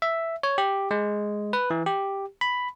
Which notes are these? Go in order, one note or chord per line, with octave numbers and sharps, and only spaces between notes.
E5
C#5
G4
G#3
B4
E3
G4
B5